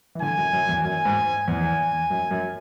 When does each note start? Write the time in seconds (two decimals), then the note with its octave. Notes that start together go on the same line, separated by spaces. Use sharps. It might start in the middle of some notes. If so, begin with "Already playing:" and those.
0.15 E3
0.21 D3 G#5
0.37 F#2
0.53 F#2
0.69 E2
0.85 F#2 G#5
1.05 G#2
1.47 E2 G#5
2.10 F#2
2.31 F#2